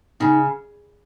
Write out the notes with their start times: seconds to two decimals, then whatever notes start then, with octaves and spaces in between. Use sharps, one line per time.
0.20 C#3 D#4